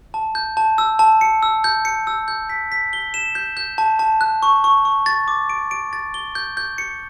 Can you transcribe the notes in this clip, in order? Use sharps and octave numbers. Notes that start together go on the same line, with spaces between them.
A5
G6
A5
E6
A5
C#7
E6
G6
C#7
E6
G6
B6
B6
G7
E7
G6
G6
A5
A5
F#6
C#6
C#6
C#6
A6
D6
D7
D7
A6
G7
G6
G6
C#7